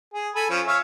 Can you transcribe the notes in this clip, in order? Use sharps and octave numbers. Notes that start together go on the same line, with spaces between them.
G#4
A4 G#5 B5
F3 C#4
C#5 E5 F5